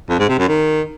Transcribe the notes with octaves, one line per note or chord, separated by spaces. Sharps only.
F2
G#2
C3
F#2
D#3